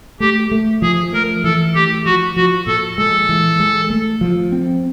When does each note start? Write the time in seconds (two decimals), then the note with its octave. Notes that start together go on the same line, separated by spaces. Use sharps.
0.20 A3 G4
0.51 A3
0.82 F3 G#4
1.13 A3 A#4
1.44 E3 A4
1.75 A3 G4
2.06 F3 F#4
2.36 F3 F#4
2.67 A#2 A4
2.98 G#3 A4
3.29 E3
3.60 G#3
3.90 A3
4.21 F3
4.52 C4